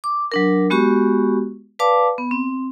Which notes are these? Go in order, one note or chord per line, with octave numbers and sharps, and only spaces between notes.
D6
F#3 D4 A#4
G#3 B3 F#4 G4 C#6
B4 D5 F5 A5 D6
B3
C4